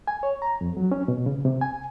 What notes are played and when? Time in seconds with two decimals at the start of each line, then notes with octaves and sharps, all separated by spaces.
0.07 G#5
0.23 C#5
0.42 A#5
0.61 F2
0.77 F#3
0.92 C#4
1.08 B2
1.26 C#3
1.45 C3
1.61 G#5